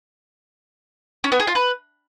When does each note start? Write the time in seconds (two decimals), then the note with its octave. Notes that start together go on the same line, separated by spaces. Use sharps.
1.24 C#4
1.32 B3
1.40 G#4
1.47 F4
1.55 B4